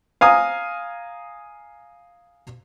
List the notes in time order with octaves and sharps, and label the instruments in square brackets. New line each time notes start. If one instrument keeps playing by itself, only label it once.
[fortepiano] F5 G#5 A#5 D#6